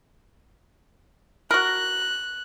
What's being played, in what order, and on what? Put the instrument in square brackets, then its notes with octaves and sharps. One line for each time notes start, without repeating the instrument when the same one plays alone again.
[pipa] F#4 A#4 [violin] F#6